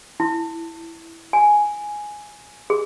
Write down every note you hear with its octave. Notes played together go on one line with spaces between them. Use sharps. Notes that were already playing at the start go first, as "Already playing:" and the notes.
E4
G#5
G#4